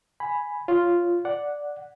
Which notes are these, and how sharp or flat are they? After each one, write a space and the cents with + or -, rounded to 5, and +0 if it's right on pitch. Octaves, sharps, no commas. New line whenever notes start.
G#5 +0 B5 +0
F4 -5 C#5 +0
D5 +0 F#5 -5